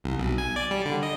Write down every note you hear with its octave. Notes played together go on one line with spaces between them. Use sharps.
C2
B1
G#5
D5
G3
D3
D#5